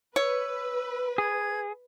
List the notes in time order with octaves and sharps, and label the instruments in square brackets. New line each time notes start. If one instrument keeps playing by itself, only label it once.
[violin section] B4 [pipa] C#5 [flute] E6
[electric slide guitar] G#4 [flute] G#6